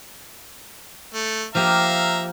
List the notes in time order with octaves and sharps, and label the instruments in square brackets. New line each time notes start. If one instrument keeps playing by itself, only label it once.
[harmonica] A3
[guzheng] F3 A#3 G4 [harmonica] E5 F5 A#5